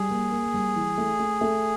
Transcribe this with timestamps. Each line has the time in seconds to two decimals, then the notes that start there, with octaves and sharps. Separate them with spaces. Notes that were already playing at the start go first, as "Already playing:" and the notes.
Already playing: G3 G#4
0.10 A#3
0.31 A#3
0.54 G3
0.76 E3
0.98 A3
1.19 A3
1.41 A3